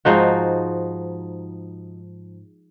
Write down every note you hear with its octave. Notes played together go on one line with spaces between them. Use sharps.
G#2 F3 D#4 F#4